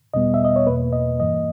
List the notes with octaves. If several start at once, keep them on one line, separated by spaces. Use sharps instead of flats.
E2 B2 G3 B3 D#5
E5
D#5
C#5
E2 B2 A#3 B4
D#5
G2 E3 A#3 D#5